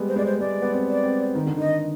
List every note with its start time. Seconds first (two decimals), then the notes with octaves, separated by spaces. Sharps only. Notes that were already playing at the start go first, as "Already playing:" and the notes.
Already playing: G3 G#3 B3
0.08 C5
0.16 G#3 D5
0.26 C5
0.40 G#3 D5
0.62 B3
0.72 C4
0.88 D5
1.04 C4
1.35 D#3
1.47 D3
1.57 D#3 D#5